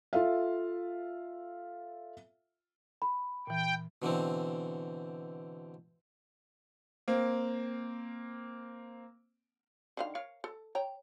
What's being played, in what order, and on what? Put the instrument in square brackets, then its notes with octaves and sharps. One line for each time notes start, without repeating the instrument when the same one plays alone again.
[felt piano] F4 A4 E5 F5
[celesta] B5
[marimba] A#2 E3 [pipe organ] G5
[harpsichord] B2 D3 E3 C4
[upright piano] A#3 C4
[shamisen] D3 D#3 F5
A#4 C#5 F5
A4
C#5 G5 A#5